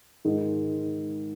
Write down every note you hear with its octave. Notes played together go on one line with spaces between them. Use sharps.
G#2 D#3 G#3